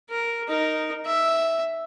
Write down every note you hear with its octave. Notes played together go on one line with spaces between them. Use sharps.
A#4
D#4 A#4
E5